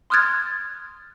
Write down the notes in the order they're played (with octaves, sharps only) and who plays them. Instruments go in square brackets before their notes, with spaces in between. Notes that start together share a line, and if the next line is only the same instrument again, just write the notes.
[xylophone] C6 D#6 F6 F#6 G#6 A6